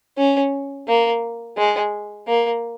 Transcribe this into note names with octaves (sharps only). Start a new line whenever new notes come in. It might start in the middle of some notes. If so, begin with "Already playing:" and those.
C#4
A#3
G#3
A#3